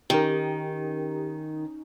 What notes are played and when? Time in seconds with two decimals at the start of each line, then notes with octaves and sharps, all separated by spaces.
0.10 D#3 C#4 D#4 G4 A#4